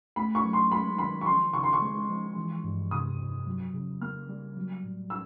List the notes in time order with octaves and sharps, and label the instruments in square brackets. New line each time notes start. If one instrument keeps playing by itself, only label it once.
[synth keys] A3 [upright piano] B5
[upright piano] C#6
[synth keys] F#3
[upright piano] C6
[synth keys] G#3 [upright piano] B5
[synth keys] D#3 [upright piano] B5
[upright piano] C#6
[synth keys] F3 [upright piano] C6
[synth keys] C#3 [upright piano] C#6
[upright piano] C6
C#6
[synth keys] G#3
F3
E3
G2
[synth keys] C3 [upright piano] D#6
[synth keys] F2
F#3
C#3
[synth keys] A#3 [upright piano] F6
[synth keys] G3
F#3
A2
[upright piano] E6